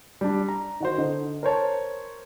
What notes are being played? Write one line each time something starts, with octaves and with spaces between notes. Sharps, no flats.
G3 D4
A#5
D#3 F#4 C5
D3 D#5
A#4 C5 C#5 A5